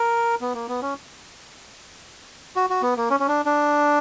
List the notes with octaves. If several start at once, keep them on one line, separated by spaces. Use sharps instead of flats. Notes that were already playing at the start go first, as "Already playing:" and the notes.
Already playing: A#4
B3
A#3
B3
C#4
F#4
F#4
B3
A#3
C#4
C#4
D4
D4